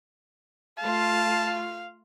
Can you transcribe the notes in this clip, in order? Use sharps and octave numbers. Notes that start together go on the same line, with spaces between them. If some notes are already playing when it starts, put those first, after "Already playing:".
A3 F4 F5 A5